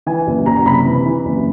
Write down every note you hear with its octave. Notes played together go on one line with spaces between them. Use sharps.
E3 G#5
F#1
F#1 A#5
A#5
C3 B5
E3
E3
F#1